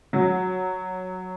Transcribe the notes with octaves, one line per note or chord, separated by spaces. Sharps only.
F#3